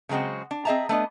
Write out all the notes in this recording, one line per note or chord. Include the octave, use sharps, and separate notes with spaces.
C#3 F#3 G#3 C4 F#4
D4
C4 G#4 D#5 E5 A5 A#5
A3 B3 D4 D#5